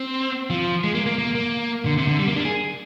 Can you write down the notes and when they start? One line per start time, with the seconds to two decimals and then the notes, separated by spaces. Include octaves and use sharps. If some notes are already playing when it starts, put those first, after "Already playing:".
Already playing: C4
0.50 F3
0.84 G#3
0.95 A#3
1.06 A#3
1.18 A#3
1.35 A#3
1.86 D3
1.97 C3
2.08 D3
2.19 G3
2.28 A#3
2.36 D4
2.45 G#4